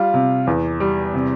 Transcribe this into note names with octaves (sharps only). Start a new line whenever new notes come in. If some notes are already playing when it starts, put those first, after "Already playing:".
Already playing: G3 F4
C3
E2
G3
C3